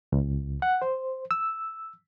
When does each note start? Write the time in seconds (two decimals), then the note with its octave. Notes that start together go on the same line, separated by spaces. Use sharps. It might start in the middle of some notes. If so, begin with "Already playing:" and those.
0.12 C#2
0.62 F#5
0.82 C5
1.31 E6